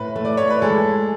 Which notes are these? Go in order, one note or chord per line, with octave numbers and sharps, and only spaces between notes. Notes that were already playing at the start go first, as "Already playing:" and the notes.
Already playing: A2 B4
A3
D5
C#5
B4
G#3 A4